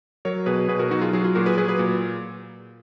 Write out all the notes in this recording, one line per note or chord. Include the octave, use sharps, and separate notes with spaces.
F#3 A#4 C#5
B2 G#4 B4
B2 G#4 B4
F#4 A#4
F#3 D#4 F#4
F4 G#4
F#3 F4 G#4
F4 G#4
A#2 F#4 A#4
G#4 B4
F#3 G#4 B4
G#4 B4
A#2